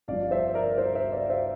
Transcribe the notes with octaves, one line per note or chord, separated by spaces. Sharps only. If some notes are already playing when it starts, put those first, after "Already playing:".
G1 G2 F3 D5 F5
C5 E5
A#4 D5
C5 E5
C5 E5
D5 F5
C5 E5